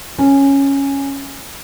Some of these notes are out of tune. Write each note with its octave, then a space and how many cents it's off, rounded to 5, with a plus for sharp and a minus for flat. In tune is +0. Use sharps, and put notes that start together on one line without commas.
C#4 -5